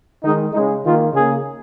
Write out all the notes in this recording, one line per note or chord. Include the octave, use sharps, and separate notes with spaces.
D#3 G#3 D#4
C#3 G#3 D#4
D#3 A#3 F4
C#3 A#3 G#4